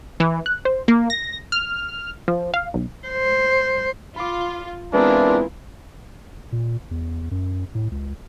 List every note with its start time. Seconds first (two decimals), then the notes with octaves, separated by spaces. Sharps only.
0.20 E3
0.46 F#6
0.65 C5
0.88 A#3
1.10 A#6
1.52 F6
2.28 F3
2.54 F5
2.74 B1
3.08 C5
4.16 F4 B5 D6
4.93 E3 G#3 B3 C4 D4 E4 F4 A#4
6.52 A#2
6.91 E2
7.31 F#2
7.75 A2
7.91 C#2